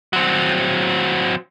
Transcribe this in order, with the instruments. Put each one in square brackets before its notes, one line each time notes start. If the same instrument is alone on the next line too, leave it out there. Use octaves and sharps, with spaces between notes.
[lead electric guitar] F#3 C4